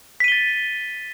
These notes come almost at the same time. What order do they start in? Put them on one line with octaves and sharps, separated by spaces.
B6 D#7 G7 A6